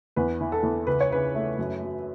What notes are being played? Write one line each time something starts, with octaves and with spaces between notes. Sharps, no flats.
E2 B4
E3
A4
E2
C#2 B4
C#5
C#3 B4
A3
F#2
F#3